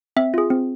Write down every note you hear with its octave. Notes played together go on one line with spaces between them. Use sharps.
C4 E5
F4 G#4
C4